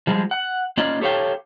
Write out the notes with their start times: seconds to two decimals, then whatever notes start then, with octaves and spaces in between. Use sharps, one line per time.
0.07 F3 G3 G#3
0.31 F#5
0.77 A#3 C#4 F4 D5 D#5
1.01 G4 A4 C#5 F5 G5